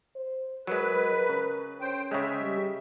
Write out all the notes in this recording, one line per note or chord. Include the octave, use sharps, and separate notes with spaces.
C5
F#3 G#3 A#4 B4
C#3
C#4 C5 G5
C#3 G#3 E5
G3